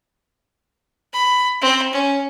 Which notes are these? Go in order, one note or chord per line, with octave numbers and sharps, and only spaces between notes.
B5
C4
C#4